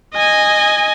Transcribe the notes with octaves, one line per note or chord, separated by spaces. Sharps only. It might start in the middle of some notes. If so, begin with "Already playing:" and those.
D#5 G#5